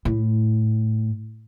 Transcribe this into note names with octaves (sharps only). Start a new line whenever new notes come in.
A2